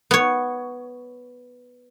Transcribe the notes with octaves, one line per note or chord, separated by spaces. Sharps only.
B3 C#5